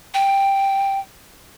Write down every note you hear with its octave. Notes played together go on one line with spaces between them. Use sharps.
G5